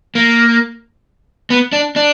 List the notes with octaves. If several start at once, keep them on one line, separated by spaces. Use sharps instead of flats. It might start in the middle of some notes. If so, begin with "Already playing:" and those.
A#3
B3
D4
D4